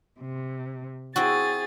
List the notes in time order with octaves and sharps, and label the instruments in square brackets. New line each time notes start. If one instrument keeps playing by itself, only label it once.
[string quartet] C3
[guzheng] C4 E4 F#4 [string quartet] G#4 A6